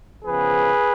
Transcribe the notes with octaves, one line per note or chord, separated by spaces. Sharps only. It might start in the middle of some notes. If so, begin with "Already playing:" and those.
C#3 F3 B3 G#4 B4